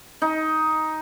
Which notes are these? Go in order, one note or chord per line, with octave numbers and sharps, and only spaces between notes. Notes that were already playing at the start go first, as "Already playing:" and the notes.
D#4